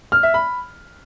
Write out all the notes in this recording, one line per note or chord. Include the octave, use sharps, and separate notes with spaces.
F6
E5
B5